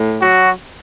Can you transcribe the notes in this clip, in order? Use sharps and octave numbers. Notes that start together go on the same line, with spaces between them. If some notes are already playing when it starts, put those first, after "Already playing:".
Already playing: A2
F#3 F#4